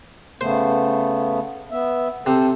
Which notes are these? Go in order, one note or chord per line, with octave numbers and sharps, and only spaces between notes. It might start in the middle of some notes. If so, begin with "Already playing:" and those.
C#3 A3 B3 C5
B3 E5
C3 A4 C5